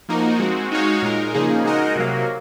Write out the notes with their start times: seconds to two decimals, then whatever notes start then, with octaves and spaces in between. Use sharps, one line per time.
0.09 F3 A#3 D#4 F#4 A#4
0.40 G#3 C4 F#4
0.71 G#3 D#4 F#4 C#5 F5
1.02 A#2 G#3 D#4 A#4
1.34 C#3 F3 A#3 D#4 G#4
1.65 G#3 D#4 F#4 A#4 D#5
1.96 C3 F#3 A#3